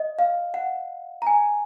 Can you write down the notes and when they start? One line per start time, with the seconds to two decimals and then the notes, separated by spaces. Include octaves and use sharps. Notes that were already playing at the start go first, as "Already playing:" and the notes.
Already playing: D#5
0.19 F5
0.54 F#5
1.22 A#5
1.27 G#5